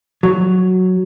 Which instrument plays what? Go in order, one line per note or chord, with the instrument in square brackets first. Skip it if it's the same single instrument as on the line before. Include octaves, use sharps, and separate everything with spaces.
[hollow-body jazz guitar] F#3